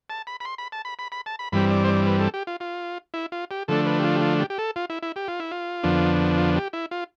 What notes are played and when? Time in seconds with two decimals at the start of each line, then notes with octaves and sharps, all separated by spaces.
0.10 A5
0.27 B5
0.40 B5
0.45 C6
0.58 B5
0.72 A5
0.85 B5
0.99 B5
1.12 B5
1.26 A5
1.39 B5
1.52 G2 E3 G3 C4 B5
1.71 D5
1.85 C5
1.88 D5
2.07 B4
2.20 A4
2.34 G4
2.47 F4
2.60 F4
3.14 E4
3.32 F4
3.51 G4
3.68 D3 F3 A3 D4 A4
3.86 B4
3.99 G4
4.04 F4
4.15 G4
4.22 F4
4.40 G4
4.50 G4
4.58 A4
4.76 F4
4.90 E4
5.03 E4
5.16 G4
5.28 F4
5.40 E4
5.51 F4
5.83 F2 D3 F3 B3 D4
6.37 F4
6.55 G4
6.73 E4
6.91 F4